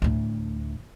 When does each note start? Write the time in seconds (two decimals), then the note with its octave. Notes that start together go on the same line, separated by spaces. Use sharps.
0.02 D2 A2